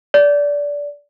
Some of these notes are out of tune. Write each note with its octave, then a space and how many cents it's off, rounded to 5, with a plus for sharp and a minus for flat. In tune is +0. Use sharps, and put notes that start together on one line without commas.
D5 -20